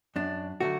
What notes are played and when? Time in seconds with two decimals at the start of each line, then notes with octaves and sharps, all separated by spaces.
0.16 F#2 D4
0.60 D3 F#3 A3 F#4